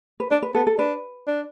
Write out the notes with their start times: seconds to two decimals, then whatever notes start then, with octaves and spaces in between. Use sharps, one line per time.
0.20 B4
0.31 D4 D5
0.42 B4
0.54 B3 A4
0.67 A4
0.78 D4 B4
1.27 D4